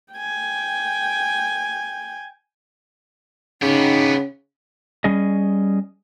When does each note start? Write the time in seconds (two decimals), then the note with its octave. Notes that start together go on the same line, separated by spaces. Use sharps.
0.13 G5 G#5
3.62 C#3 B3 D#4 G4
5.04 G3 C#4 G#4 D#5